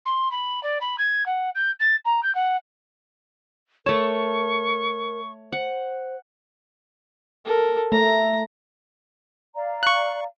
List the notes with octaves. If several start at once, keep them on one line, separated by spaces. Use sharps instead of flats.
C6
B5
D5
B5
G#6
F#5
G6
A6
A#5
G6
F#5
A3 A#4 C#5 A5 C#6
C5 F#5
A4 A#4
A3 A#5
D5 F5 A#5
C#6 F#6